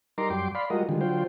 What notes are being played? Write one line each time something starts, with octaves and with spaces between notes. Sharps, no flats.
G3 D#4 A#4 A#5 C6 D6
F#2 G3 G5 C6 D6
D5 F5 B5 C6
G3 G#3 F4 F#4 A#4 D#5
D3 D#3 F3 G3 G#3
D3 F#3 F4 C5 G5